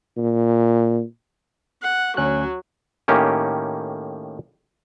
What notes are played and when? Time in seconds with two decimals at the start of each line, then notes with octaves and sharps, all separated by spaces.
0.17 A#2
1.83 F#5
2.17 D2 F#3 C#4 F#6
3.08 A2 D#3 A#3 C#4 G4